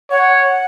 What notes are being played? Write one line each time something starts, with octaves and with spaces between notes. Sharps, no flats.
C#5 F#5